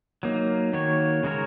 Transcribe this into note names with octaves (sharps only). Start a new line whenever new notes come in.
F#3 A#3 D#4
D#3 A#3 F#4 C#5
C#3 G#3 F#4 A#4 C#5